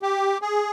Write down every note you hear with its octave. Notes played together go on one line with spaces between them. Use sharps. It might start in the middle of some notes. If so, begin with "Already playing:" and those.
G4
G#4